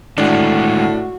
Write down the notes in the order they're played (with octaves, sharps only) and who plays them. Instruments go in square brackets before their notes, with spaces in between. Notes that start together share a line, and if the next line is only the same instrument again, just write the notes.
[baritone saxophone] A2 [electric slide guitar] D3 D#3 G#3 [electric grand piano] D4 [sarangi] F#4